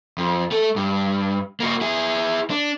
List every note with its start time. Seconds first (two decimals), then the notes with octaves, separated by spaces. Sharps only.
0.18 F2
0.52 A3 A4
0.76 G2
1.60 A#3 F#4
1.81 E4 G#4
2.50 D4